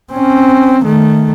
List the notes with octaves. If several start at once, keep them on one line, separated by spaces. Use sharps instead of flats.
C4 C#4
D#3 A3